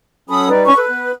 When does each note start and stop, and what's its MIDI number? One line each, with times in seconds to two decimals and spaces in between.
0.29 0.49 54
0.29 0.49 61
0.29 0.49 69
0.29 0.48 83
0.29 0.48 87
0.49 0.69 55
0.49 0.69 63
0.49 0.69 71
0.49 0.65 74
0.65 0.76 61
0.65 0.76 85
0.77 0.85 69
0.77 1.10 71
0.89 1.12 59